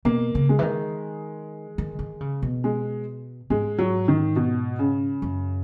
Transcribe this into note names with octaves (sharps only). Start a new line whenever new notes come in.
B2 A#3
C#3
G#3
E3
D#3
D#3
D#3
C#3
B2
G#3
G#2 G#3
F#3
D#3
B2
C#3
F#2